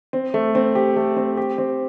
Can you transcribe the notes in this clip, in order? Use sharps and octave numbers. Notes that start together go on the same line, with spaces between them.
C4
A3
C4
G4
A3
C4
G4
C4